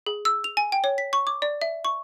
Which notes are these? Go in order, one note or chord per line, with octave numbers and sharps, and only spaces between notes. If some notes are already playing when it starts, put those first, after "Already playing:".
G#4
E6
F7
G#5
G5
C#5
B6
C#6
D6
D5
E5
C#6